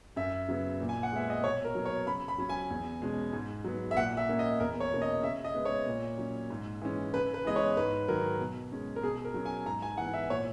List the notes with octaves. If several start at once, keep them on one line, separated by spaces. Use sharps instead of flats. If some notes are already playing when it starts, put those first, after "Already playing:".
F#2 E5
C#3 F#3 B3
A#2
G#5
F#5
G#3 B3 E5
D#5
B2 C#5
A#4
F#3 B3
C#5
C#3 B5
B5
F#3 C#4
G#5
E2
B2 G#3 C#4
G#2
F#3 B3
E5
A#2 F#5
E5
A#3 C#4
D#5
E2 A#4
C#5
B2 A#3 C#4
D#5
C#3 E5
D#5
G#3 B3
C#5
A#2
F#3 C#4
G#2
E3 G#3 C#4
C#3 B4
B4
E3 G#3 B3 D#5
C#5
G#2 B4
D#3 F#3 A#4
B2
G#3 C#4
A#4
B2 G#4
A#4
F#3 C#4
G#5
G#2 A#5
G#5
E3 B3 F#5
E5
A#2 C#5